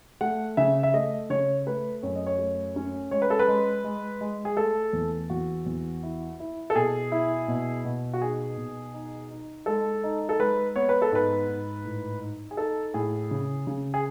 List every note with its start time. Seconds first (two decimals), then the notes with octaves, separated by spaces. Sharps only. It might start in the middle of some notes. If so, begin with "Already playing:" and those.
0.21 A3 F#5
0.57 C#3 E5
0.83 E5
0.94 A3 D#5
1.30 C#3 C#5
1.66 A3 B4
2.03 F#2 C#5
2.15 D#5
2.27 C#5
2.38 A3
2.76 C#4
3.11 G#3 C#5
3.22 B4
3.30 A4
3.39 B4
3.48 G#3
3.84 G#3
4.21 G#3
4.45 G#4
4.57 A3 A4
4.93 E2
5.30 E2 F#4
5.66 E2
6.03 E4
6.40 E4
6.70 A4
6.75 B2 G#4
7.12 E4
7.48 B2
7.85 B2
8.13 F#4
8.21 D#4 G#4
8.57 B2
8.94 D#4
9.31 D#4
9.66 G#3 A4
10.03 D#4
10.29 A4
10.39 G#3 B4
10.76 B3 C#5
10.89 B4
11.02 A4
11.12 G#2 B4
11.48 G#2
11.85 A2
12.22 D#4
12.51 G#4
12.57 D#4 A4
12.94 A2 G#4
13.31 C#3
13.67 C#3
13.94 G#4